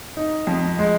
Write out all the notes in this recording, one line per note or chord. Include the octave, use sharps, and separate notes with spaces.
D#4
F2
G#3